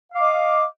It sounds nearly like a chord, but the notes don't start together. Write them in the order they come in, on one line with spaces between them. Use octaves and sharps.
F5 D6 D#5